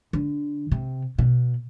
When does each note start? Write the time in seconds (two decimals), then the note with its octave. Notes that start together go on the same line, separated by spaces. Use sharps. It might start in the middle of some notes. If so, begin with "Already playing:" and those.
0.13 D3
0.72 C3
1.19 B2